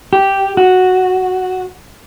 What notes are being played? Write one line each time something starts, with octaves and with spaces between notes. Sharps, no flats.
G4
F#4